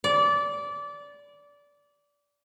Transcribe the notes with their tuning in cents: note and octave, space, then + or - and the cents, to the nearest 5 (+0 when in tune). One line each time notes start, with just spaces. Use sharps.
D5 -20